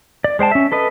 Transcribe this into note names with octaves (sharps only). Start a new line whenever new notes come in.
D5
G#3 C5 G5 A5
C#4 E5
A4 B4 D#5